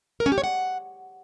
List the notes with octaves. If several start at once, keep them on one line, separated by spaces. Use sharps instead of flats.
A#4
C#4
G4
C#5
F#5